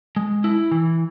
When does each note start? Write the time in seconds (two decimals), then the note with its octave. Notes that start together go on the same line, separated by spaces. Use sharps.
0.16 G#3
0.44 E4
0.71 E3